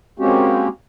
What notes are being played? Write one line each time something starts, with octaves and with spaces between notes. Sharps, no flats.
G#3 A#3 C4 C#4 F#4 G4